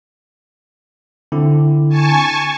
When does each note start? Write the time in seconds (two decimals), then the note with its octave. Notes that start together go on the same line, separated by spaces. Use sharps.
1.32 D3 C4 E4
1.89 G#5 A5 C#6